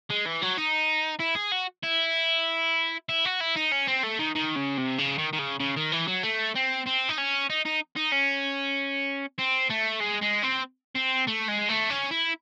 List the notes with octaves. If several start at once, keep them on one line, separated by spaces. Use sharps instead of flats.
G#3
E3
F#3
D#4
E4
G#4
F#4
E4
E4
F#4
E4
D#4
C#4
C4
A3
D#3
D#3
C#3
C3
C#3
D#3
D#3
C#3
C#3
D#3
E3
F#3
A3
C4
C4
D#4
C#4
D#4
D#4
D#4
C#4
C4
A3
G#3
G#3
C4
C4
A3
G#3
A3
C#4
E4